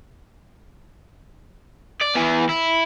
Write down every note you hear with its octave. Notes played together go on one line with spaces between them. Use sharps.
D5
E3 B3
E4